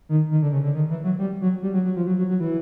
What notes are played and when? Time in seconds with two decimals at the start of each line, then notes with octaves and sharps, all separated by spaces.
0.09 D#3
0.31 D#3
0.42 D3
0.52 C#3
0.64 D3
0.75 D#3
0.90 E3
1.04 F#3
1.19 G3
1.41 F#3
1.63 G3
1.74 F#3
1.85 F#3
1.96 F3
2.07 F#3
2.18 F#3
2.29 F#3
2.40 E3